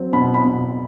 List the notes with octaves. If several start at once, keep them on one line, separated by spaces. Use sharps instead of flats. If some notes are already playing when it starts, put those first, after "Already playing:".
Already playing: F#3 C4
B2 B5
B5
B2